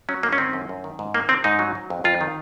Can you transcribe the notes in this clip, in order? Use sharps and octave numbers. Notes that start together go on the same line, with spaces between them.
F#3 C#4
G#2 A#3
C#4
D#3 C4
F#2
F#2
D#3
G#2
D#3 A#3
C3 C4
G#2 D#4
F#3
F#3
F2
F2 F4
D#3